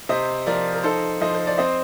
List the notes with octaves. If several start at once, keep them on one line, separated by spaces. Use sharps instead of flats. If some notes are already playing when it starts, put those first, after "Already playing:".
C3 C5 D#5
F3 A#4 D5
A#4
D#4 A4 C5
F3 C5 D#5
C5
D5
C4 C5 D#5